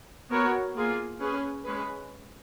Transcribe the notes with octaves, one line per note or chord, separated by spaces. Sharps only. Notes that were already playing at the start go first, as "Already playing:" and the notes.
B3 F#4 A#4 C#5
A#3 F4 G#4
C#4 G#4 B4
G#3 C#4 G#4 B4